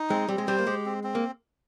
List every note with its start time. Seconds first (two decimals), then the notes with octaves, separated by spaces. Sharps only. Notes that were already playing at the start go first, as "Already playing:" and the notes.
Already playing: D#4
0.10 G#3 C4
0.29 G3 C4
0.38 G#3
0.47 G3 C5
0.59 A#3
0.66 G#3 G4
0.86 C4
1.04 C4
1.15 A#3